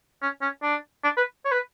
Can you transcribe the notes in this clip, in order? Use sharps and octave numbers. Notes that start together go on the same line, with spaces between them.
C#4
C#4
D4
D4
B4
C#5
B4